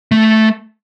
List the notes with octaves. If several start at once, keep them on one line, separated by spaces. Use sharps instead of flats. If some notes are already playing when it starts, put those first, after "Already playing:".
A3